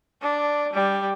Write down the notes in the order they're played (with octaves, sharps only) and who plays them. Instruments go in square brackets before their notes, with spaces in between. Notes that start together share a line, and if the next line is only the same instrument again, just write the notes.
[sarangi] D4
G3